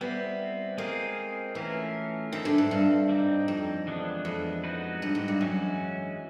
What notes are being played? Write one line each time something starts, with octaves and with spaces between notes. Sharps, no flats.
G3 B3 C4 E4
G#3 A#3 C4 F4 G#4
E3 A3 C#4 F4 A#4
D#3 C4 E4 A4
D3
G#2
G2
G3 C4 D#4
F2
E3 G#3 B3 D4
F2
G#3 B3 D#4 F#4 B4
G2
G#2
G2
F#2 E3 G#3 C#4 F#4